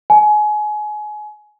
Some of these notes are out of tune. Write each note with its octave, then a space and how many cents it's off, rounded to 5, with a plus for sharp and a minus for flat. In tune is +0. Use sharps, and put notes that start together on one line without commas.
G#5 +25